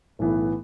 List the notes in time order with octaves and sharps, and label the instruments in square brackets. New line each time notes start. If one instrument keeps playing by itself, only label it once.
[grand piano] B1 A2 E3 B3